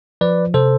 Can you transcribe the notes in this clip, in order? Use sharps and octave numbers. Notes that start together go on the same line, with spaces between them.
F3 B4 D5
C3 A4 C5